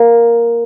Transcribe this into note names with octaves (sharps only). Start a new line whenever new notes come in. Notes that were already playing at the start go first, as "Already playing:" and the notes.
Already playing: A#3